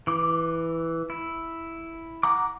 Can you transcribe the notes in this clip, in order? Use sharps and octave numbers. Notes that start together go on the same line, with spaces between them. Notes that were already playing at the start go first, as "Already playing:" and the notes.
E3 D6
E4
F#5 A#5 D6